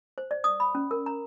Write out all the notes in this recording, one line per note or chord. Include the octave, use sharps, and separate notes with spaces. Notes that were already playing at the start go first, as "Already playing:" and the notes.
C5
D5
D#6
B5
C#4
A#4
A#5